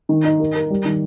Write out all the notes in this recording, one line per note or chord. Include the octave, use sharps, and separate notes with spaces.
D#3
D#4
A#4
A#4
G3
D#3